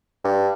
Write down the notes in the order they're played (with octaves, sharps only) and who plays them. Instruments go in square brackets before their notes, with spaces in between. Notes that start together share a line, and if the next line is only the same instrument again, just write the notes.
[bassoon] G2